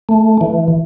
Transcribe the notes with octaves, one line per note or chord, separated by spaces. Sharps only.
A3
E3